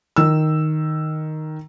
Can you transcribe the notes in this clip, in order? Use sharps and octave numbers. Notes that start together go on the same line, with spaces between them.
D#3 E6